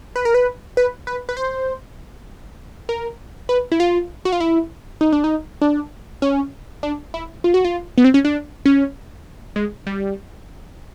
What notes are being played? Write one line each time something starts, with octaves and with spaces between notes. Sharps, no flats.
B4
A#4
B4
B4
B4
B4
C5
A#4
B4
E4
F4
F#4
F4
E4
D#4
D4
D#4
D4
C#4
D4
E4
F4
F#4
F4
B3
C4
C#4
D4
C#4
G#3
G3